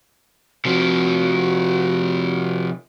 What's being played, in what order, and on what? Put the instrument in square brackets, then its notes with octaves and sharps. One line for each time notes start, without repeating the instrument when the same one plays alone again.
[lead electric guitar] C3 F3 [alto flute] F#4